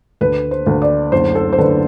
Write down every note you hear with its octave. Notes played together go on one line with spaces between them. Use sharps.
D2 B4
C5
D2
D5
F#1 C5
A4
C5
D3 B4